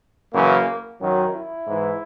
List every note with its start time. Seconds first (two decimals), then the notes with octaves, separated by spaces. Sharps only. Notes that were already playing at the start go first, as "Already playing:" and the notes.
0.34 F#2 C#3 E3 A#3
1.00 F#2 D#3 F#3
1.34 E4
1.67 G#2 E3